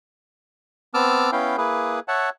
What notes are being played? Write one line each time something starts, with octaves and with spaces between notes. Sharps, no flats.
B3 C4 A5 D6 E6 F6
B3 C#4 E4 F5 G5
A#3 E4 G#4 B4
C#5 E5 F#5 A5